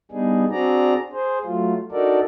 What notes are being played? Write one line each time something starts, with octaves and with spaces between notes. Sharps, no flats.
G3 B3 D4 D#4 G#4
C4 D4 F#4 G#4 D5 A#5
G#4 C5
F#3 A3 F4
D4 D#4 F#4 A4 A#4 D5